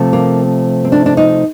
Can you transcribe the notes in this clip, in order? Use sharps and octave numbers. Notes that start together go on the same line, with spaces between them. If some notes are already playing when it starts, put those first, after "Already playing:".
Already playing: C3 F3 A3
A#3
C4
D4
D4
D#4